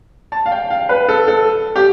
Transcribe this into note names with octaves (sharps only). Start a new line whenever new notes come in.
A5
F5
G5
F5
B4
A4
A4
G4